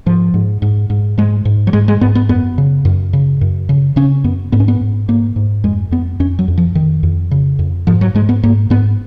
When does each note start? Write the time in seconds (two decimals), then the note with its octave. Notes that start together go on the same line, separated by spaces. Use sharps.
0.06 G#2 F3
0.34 G#2
0.62 G#2
0.90 G#2
1.18 G#2 G#3
1.45 G#2
1.67 F#3
1.73 G#2 G#3
1.88 G#3
2.01 G#2 B3
2.15 B3
2.29 F#2 B3
2.58 C#3
2.85 F#2
3.13 C#3
3.41 F#2
3.69 C#3
3.96 C#3 C#4
4.24 F#2 B3
4.52 G#2 B3
4.60 C#4
4.68 B3
4.81 G#2
5.08 G#2 A#3
5.36 G#2
5.64 F2 G#3
5.91 F2 B3
6.20 F2 C#4
6.39 F#3
6.48 F2
6.58 F3
6.75 F2 D#3
7.03 F2
7.31 C#3
7.59 F2
7.87 G#2 F3
8.01 F#3
8.15 G#2 G#3
8.29 B3
8.43 G#2 A#3
8.70 G#2 B3